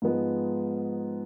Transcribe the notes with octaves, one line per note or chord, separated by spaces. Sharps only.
G#2 F3 G#3 B3